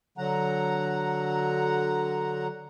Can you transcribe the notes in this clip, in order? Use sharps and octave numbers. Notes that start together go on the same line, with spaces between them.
D3 F#3 F#5 A#5